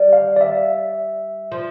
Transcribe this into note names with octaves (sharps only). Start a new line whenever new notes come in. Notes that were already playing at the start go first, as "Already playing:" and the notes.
Already playing: G3
F5
D5
E5
F3